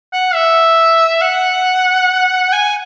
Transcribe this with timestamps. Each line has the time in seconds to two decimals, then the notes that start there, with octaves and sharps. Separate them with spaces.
0.13 F#5
0.34 E5
1.21 F#5
2.52 G#5